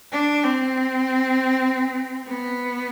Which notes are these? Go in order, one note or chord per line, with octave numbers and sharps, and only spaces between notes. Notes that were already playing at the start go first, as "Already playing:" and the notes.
D4
C4
B3